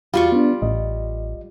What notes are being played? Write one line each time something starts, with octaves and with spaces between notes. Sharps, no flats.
E2 G3 F4 F#4 F5 C#6
B3 D4
A1 D#5